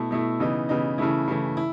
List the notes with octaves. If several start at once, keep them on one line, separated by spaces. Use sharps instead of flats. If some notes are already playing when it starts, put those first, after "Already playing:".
Already playing: B2 A3 E4
B2 A3 E4
C#3 E3 B3 D#4
C#3 E3 B3 D#4
C#3 E3 A3 E4
C#3 E3 A3 E4
E4